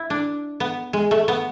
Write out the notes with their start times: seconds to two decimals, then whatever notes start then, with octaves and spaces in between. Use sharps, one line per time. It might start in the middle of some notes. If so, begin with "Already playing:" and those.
Already playing: E4
0.10 D4
0.60 B3
0.93 G#3
1.11 A3
1.28 B3